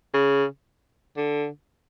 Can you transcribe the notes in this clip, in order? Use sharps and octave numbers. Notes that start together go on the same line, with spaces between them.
C#3
D3